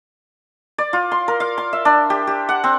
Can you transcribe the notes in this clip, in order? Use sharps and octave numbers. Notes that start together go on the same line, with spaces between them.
D5
F4
C6
A#4
F5
C6
E5
D4
G4
G4
F#5
C4